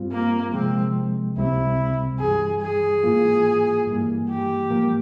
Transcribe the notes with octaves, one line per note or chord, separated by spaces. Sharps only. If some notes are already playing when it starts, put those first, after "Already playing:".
Already playing: G2 G3 C4 F4
A#3
C3 F3 G#3 C4
C#2 C3 G3 C4 E4
G2 E3 G3 G#4
G#4
G#2 E3 A#3 F4
G2 E3 G3 A#3
G4
G#2 F3 A#3